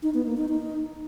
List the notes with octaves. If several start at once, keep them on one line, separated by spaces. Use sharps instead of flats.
D#4
B3
A#3
D#4
D#4